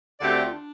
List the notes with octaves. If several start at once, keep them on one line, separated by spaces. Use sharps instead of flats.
D2 D3 A3 C4 G4 D5
F4
D4